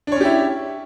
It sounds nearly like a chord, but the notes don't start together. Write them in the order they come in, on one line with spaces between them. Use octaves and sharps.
D4 C#5 C#4 G4 E4